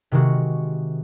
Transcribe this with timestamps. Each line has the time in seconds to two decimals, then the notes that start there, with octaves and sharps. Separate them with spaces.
0.12 C3 D#3 G#3 F#4